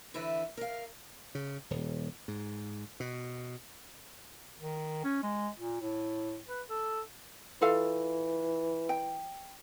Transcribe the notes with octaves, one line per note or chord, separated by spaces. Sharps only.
D3 E3 E4 B4
A#4 F5
C#3
D#1
G#2
B2
D#3
C#4
G#3
A#2
A2
B4
A4
E3 F4 A4 F5
G5